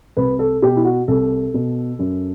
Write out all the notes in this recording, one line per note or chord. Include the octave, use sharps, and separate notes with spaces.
C2 B4
A4
B2 G4
E4
F#4
C2 A4
B2
F#2